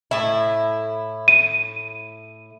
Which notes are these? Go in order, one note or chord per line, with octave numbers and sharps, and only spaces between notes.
A2 E4
D#7